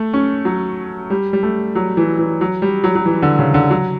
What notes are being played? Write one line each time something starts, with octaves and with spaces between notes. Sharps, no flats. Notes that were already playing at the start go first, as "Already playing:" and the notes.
Already playing: A3
C#4
F#3
G3
G3
A3
F#3
E3
E3
F#3
G3
F#3
F#3
E3
D3
C#3
D3
F#3